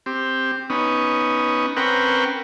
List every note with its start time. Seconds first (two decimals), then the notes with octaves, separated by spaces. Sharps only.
0.06 C4 G4
0.70 B3 C#4 D#4
1.77 C4 C#4 A#4 B4 F#5 G5